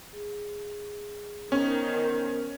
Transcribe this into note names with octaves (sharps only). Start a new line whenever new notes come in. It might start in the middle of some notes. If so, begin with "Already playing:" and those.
G#4
D#3 B3 C#4 A#4 C5